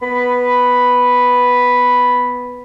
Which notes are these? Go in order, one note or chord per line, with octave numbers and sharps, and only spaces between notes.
B3 B5